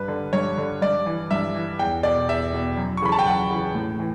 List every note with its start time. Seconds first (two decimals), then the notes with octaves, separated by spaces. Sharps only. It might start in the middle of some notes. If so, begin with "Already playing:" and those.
Already playing: G2 B4
0.08 D3
0.33 G2 C#5
0.57 D3
0.82 G2 D5
1.06 E3
1.31 G2 E5
1.55 E3
1.79 E2 G5
2.03 B2 D5
2.29 E2 E5
2.53 B2
2.77 F#2
2.97 C#6
3.02 C#3 E3 B5
3.12 A5
3.19 G5
3.26 F#2 F#5
3.51 C#3 E3
3.75 A2
3.99 E3